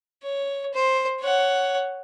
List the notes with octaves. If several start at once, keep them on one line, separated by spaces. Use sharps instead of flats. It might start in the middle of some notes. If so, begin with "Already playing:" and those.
C#5
C5
C#5 F#5